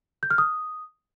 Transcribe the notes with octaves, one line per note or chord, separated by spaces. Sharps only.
G6
F6
D#6